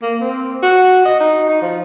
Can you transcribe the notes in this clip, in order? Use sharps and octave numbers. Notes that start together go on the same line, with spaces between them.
A#3
C4
F#4
D#5
D#4
D#4
F3